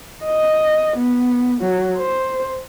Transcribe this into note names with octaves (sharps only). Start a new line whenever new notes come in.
D#5
B3
F#3
C5